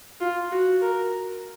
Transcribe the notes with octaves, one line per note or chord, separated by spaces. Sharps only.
F4
F#4
A#4